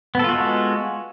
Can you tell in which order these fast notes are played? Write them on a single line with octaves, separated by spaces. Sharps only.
B3 A4 F4 F#4 G#3